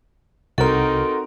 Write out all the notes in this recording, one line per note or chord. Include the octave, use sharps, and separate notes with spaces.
C2 C4 D#4 F#4 A4 A#4 C6